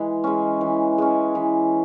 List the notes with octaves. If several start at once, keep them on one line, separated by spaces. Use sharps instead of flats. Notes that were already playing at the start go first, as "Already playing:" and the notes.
Already playing: E3 G#3
G#3 C#4
E3
G#3 C#4
E3